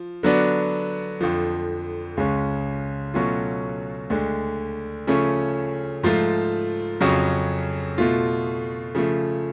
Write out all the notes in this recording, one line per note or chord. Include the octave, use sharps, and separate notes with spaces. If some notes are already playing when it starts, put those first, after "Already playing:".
Already playing: F3
D3 F#3 B3 D4
F2 D3 F3
C#2 C#3 G#3 C#4
B2 F#3 A3 C#4 F4
D2 D3 G#3
C#3 F3 A3 C#4
G#2 F3 A3 F4
F2 C#3 F#3 C#4
B2 A3 F4
C#3 F3 A3